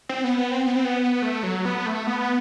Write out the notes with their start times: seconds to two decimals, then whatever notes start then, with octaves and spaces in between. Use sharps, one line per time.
0.09 C4
0.24 B3
0.38 B3
0.51 C4
0.67 B3
0.76 C4
0.85 B3
1.22 A3
1.43 F#3
1.65 B3
1.86 A3
2.07 B3